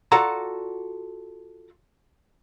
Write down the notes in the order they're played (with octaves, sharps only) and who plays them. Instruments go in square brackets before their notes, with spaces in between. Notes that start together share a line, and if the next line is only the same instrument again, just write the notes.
[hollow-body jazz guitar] F4 F#4 A4 D5 F#5 A#5